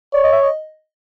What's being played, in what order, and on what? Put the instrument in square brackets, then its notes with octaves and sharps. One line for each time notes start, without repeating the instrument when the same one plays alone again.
[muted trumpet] C#5 [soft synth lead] D5
[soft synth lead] D#5
E5
D#5